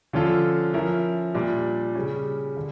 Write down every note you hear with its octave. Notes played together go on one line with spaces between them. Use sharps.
D3 F3 C#4 F4 A4
F3 C#4 E4 A#4
A#2 G3 D4
C#3 G3 C#4
D3